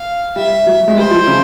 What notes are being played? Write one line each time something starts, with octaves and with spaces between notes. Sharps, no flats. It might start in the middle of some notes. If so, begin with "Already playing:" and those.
Already playing: F5
G3 E5
F#3
G#3
G3 C5
F3
C#3